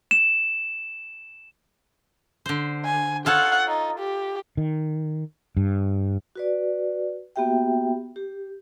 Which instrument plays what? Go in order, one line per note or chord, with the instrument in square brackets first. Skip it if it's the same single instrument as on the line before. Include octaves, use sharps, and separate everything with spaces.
[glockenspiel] E7
[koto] D3 C5
[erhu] G#5
[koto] F4 A4 C#5 [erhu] F#5
[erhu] D#4
G4
[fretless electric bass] D#3
G2
[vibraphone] F#4 B4 D5
A#3 B3 F#4 G4 E5 G5
G4